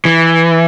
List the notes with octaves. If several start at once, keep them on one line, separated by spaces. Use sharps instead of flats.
E3